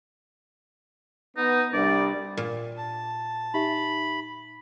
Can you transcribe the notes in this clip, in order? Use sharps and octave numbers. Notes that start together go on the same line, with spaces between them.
B3 D#4
C2 G3 D4 D5
A#2
A5
D#4 G4 E5 B5